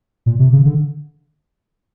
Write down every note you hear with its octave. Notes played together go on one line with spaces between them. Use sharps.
A#2
C3
C#3
D3